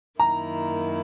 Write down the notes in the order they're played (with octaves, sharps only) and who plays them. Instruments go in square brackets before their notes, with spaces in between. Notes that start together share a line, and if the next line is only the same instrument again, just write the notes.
[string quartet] F#2 D#3 A#3 E4 [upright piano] A#5